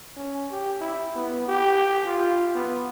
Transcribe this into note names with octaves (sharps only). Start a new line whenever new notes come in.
C#4
G4
E4
B3
G4
F4
B3